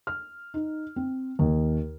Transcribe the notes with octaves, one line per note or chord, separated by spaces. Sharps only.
F6
D#4
C4
D#2